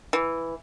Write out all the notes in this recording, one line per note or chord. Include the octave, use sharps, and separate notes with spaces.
E3